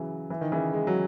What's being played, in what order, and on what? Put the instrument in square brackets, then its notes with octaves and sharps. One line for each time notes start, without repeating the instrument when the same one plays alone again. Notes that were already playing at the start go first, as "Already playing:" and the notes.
Already playing: [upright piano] C#3 E3 F#3
E3
D#3
C#3 E3
G#3
F#3